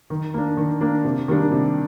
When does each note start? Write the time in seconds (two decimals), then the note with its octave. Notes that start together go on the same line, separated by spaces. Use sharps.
0.10 D#3
0.34 A#3 D4
0.57 D#3
0.81 A#3 D4
1.04 C3
1.28 D#3 G3 A#3 D4
1.51 C3